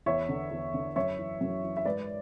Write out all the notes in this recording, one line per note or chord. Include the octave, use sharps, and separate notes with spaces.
E2 C#5 E5
D3
E2
D3
F#2 C#5 E5
E3
F#2
E3
E5
G#2 B4 D5